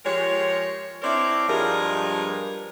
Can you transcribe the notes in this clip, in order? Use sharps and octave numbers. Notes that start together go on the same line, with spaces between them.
F3 G#3 G4 A#4 C#5
C4 D4 E4 A#4 C#5 D5
G2 F3 G3 G#3 G#4 A#4